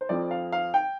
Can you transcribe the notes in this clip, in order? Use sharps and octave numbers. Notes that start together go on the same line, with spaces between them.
C5
F2 F3 C4 D5
F5
F5
G5